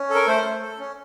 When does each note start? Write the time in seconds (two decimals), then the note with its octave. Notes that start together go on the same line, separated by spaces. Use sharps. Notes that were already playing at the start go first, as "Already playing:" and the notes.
Already playing: C#4
0.10 A4 A#4
0.27 A3 C5
0.45 A3
0.62 A4
0.79 C#4